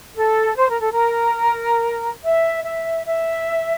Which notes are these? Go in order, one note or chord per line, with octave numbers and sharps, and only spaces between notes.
A4
C5
A#4
A4
A#4
E5
E5
E5